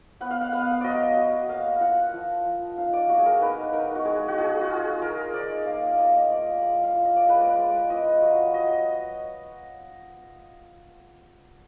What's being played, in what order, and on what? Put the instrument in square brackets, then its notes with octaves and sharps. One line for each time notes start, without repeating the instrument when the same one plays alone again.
[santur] B3 F#5
F5
F#5
B3 F5
F#3 D5 D#5
F#3
A#3 F5
F4 F#5
F3
F3
D#4 F5
D5
A#3 F#4
G#4
A#4
D#4 B4
D#4 A#4
F#4
G#3 G#4
F#4
F4 G#4
F#4
F4 G#4
F4 A#4
D#4 D5
A#3 F5
A#3 D#5
A#3 D5
G#3
F5
F4
D#5
D5
G#3 B4
D5
G#3
F4 D#5
F#3
F#3 D#5